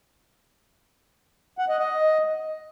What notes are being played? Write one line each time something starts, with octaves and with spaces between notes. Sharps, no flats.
F#5
D#5
D#5